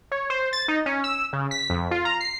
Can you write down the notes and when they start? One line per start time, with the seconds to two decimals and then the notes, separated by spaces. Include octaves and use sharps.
0.12 C#5
0.30 C5
0.53 A6
0.68 D#4
0.86 C#4
1.04 E6
1.33 C#3
1.51 B6
1.70 F2
1.91 F4
2.05 A#5
2.20 C7